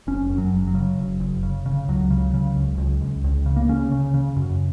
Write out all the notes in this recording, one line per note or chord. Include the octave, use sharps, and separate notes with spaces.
F#1 C#4
F#2
F#3
F#1
F#3
C#3
F#1
F#1
C#3
C#3
C#2 F#3
C#3
C#3
C#2
C#2
C#2
C#2
C#3
A#3
C#3 C#4
C#3
C#3
F#2